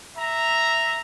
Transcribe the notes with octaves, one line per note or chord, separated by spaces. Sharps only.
E5 A#5